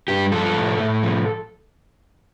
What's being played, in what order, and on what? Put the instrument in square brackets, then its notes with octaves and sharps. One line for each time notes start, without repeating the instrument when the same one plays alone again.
[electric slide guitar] G2 G4
F3 A4
A2
A2
F3